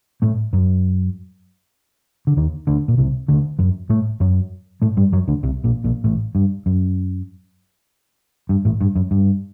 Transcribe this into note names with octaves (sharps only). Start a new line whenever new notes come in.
A2 A3
F#2 F#3
D3
D#2 D#3
D2 D3
A#2
C2 C3
D2 D3
F#2 F#3
A2 A3
F#2 F#3
A2 A3
G2 G3
F#2 F#3
D2 D3
C2 C3
A#1 A#2
A#1 A#2
A1 A2
G2
F#2
G2
A1 A2
G2
F#2
G2